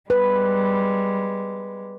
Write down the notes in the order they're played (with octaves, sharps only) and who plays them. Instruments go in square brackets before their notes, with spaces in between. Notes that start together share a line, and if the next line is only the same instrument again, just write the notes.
[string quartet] G3 G#3 [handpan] B4